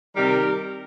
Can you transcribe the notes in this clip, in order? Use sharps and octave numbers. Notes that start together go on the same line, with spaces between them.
C3 D#3 G3 G4 A#4